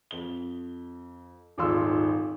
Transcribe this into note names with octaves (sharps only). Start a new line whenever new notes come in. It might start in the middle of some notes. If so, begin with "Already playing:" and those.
F2 G7
D#1 G#1 F4 C6 E6